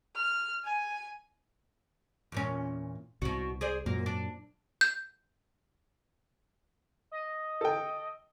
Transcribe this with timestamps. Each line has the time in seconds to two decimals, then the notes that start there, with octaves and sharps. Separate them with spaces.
0.16 F6
0.65 G#5
2.32 E2 A#2 C#4
3.22 C2 B2 F#4
3.61 G#4 C5 D5
3.86 F#2 A#2 A#3
4.06 D4
4.81 G6
7.11 D#5
7.61 A4 G5